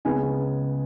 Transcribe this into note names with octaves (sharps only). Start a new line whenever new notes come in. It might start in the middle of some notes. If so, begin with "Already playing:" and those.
C#2 C#3 B3 G#5